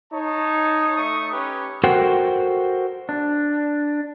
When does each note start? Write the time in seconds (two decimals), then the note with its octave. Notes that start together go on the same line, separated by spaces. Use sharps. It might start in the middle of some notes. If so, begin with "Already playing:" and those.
0.13 D#4 C#5 A5
0.96 A3 C#6 D#6
1.32 C#4 G4 B4
1.84 F#4 A4 A#4 C5 F#5 G5
3.09 D4